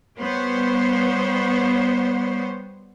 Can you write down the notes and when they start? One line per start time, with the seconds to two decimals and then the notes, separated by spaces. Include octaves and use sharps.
0.18 G3 B3 C5 C#5